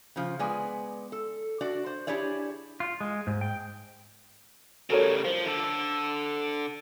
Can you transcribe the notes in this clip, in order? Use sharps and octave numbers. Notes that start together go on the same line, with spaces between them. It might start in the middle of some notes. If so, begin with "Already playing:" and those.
C#3 F3
G#3 B3 D5 G#5
A4
D4 F#4 D5
C5
D4 E4 G4 G#4 C#5 D5
F4
G#3
G#2
G5
C#3 G3 A4 A#4 C#5
F3 C5
D3 A4